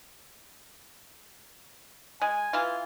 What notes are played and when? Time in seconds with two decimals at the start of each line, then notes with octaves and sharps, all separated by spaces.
2.22 G#3 G#5
2.53 E3 F4